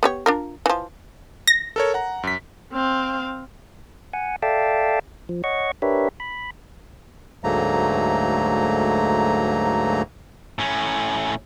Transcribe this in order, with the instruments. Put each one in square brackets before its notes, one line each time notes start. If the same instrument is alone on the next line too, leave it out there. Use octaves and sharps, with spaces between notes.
[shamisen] B3 G4 C#5
D4 F4 A#4
E3 F3
[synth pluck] A#6
[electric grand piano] A4 A#4 C#5
F#5 A#5
F#2 B6
[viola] C4 F5
[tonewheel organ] F#5 G#5
A4 D5 E5 F5 G5 A5
F3
C#5 D#5 F#5 C#6
D4 G4 A#4 B4 C#5 E5
B5
[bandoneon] D2 G#2 F#3 A3 A#3 A#5
[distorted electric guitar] A2 C#4